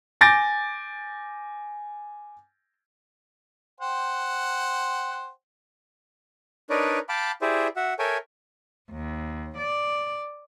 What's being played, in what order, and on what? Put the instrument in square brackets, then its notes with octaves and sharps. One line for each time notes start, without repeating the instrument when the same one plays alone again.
[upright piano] G#5 D6 G6 A6 A#6 D7
[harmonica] C5 F#5 G5
[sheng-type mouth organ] D4 D#4 A#4 B4 C#5 D5
F5 G5 A5 B5 D6
E4 G4 G#4 C5 D5 E5
F#4 E5 F#5
A4 A#4 C#5 E5 G5 G#5
[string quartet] D#2
D5